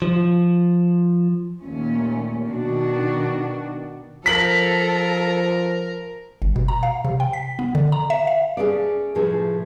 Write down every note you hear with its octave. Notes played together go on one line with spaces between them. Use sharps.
F3
D#2 A#2 A3 C#4
B2 D#3 D4 F#4
F3 A4 A#4 B6 F#7
G1
B2
A#5
F5
C3
G5
B6
B3
D3
A#5
E5
F5
C#4 G#4 A4 B4 D5
A2 C3 F3 G#4 A4 B4